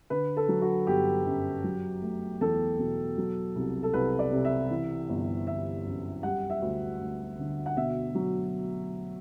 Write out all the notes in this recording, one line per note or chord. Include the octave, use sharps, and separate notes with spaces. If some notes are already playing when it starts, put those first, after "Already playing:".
D3 B4
A4
F#3
F#4
G1 G4
F#2
F#3
A3
E2 A4
B2
F#3
C2
A4
C2 B4
D5
C3
E5
E3
G1
G1 E5
F#2
G3 F#5
E5
D2
D2
D3
F#5
B2 E5
F#3